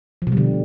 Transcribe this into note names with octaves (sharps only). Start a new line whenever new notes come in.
F3
B2
G3
D3